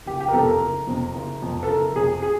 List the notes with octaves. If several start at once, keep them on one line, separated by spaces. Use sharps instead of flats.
F#1 G4
G4
A#4
F2 C3 A4
A#4
F#1
F2 C3
F#1
F2 C3
A4
F#1 A#4
F2 C3 G#4
G#4